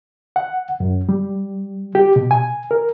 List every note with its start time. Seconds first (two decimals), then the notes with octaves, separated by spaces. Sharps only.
0.36 F#5
0.80 F#2
1.09 G3
1.95 G4
2.16 B2
2.31 G#5
2.71 A#4